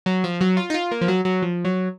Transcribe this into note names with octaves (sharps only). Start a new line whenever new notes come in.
F#3
F3
F#3
F4
D#4
F4
A#3
F3
F#3
F#3
F3
F#3